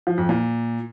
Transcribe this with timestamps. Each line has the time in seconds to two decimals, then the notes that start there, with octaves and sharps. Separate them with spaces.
0.07 F3
0.18 F2
0.29 A#2